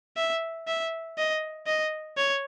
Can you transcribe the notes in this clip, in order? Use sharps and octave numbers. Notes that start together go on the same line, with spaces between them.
E5
E5
D#5
D#5
C#5